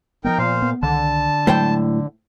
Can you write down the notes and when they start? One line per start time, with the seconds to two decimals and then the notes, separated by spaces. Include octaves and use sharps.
0.24 F3 G3 B3 D#4 A#4 G5
0.38 A#2 C5 F5
0.62 B3
0.83 C2 D3 D#3 A5
1.47 A2 F#3 G#3 C5 G5